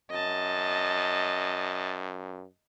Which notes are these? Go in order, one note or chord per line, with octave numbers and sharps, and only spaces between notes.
F#2 D#5 A5